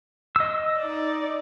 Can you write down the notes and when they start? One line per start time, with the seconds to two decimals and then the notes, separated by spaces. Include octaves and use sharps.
0.36 D#5 E6
0.79 D#4 D5